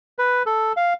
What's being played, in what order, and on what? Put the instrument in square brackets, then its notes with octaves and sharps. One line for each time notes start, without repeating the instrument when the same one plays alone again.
[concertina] B4
A4
F5